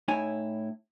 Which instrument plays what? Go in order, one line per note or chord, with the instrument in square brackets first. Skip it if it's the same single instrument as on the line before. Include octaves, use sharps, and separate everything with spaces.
[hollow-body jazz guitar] A2 D#4 E4 C#5 G#5